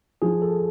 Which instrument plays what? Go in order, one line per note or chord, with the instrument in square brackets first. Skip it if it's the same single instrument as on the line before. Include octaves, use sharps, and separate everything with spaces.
[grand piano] F3 [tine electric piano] G#4
[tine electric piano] A4